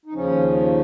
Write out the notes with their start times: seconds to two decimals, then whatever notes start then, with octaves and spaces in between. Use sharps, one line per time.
0.06 D#4
0.13 D#2 C#3 F3 C#4